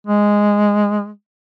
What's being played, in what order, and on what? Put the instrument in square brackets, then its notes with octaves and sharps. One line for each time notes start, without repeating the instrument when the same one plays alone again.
[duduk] G#3